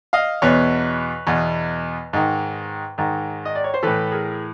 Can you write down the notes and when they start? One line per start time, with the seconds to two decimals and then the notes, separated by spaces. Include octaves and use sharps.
0.13 D#5 F5
0.42 E2 B2 B4 C#5
1.27 E2 B2
2.13 G#2 D#3
2.98 G#2 D#3
3.45 D#5
3.55 D5
3.64 C#5
3.74 C5
3.83 A2 E3 A4 B4
4.12 G#4 A#4